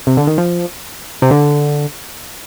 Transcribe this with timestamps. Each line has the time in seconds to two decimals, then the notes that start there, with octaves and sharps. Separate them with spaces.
0.07 C3
0.17 D3
0.27 D#3
0.38 F3
1.22 C3
1.31 D3